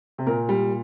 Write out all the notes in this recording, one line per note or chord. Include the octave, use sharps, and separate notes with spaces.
C3
A#2 A#4
G3